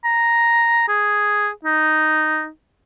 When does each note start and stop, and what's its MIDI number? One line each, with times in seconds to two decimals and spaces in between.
0.04 0.88 82
0.89 1.50 68
1.65 2.48 63